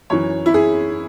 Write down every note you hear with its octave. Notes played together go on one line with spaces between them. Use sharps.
F#2 E3 C#5
E4
G#4